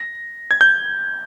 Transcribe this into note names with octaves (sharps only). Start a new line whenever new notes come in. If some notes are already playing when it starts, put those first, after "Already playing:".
Already playing: A#6
G#6
G6